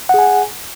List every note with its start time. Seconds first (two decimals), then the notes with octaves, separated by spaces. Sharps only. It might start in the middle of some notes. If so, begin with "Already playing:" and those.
0.09 F#5
0.14 G#4
0.19 G#5